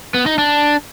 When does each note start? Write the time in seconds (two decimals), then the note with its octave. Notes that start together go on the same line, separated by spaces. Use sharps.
0.14 B3
0.26 D#4
0.38 D4